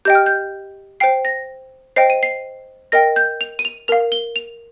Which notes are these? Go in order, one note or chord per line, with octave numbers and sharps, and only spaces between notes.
G4 D#5 G5 G6
F6
G6
C5 G5 C7
A#6
C5 D#5 G5 C7
D#7
C7
A#4 D#5 G5 A#6
G6
F7
D#7
F7
A#4 F5 F7
G7
F7